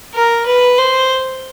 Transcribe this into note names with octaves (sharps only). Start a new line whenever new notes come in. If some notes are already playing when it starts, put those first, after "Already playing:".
A#4
B4
C5